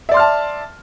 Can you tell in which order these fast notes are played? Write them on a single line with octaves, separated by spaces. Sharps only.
E5 D5 C6 F6 A5